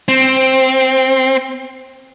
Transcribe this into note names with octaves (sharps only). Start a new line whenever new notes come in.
C4